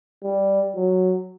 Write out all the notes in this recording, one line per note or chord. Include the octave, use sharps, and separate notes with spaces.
G3
F#3